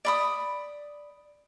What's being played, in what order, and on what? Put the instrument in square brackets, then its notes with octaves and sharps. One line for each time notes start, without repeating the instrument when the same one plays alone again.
[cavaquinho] D5 B5 D#6